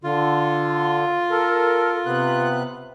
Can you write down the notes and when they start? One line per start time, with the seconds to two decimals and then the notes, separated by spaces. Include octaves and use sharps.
0.04 D3 F4
1.31 A4 A#4
2.06 C3 B3 F#6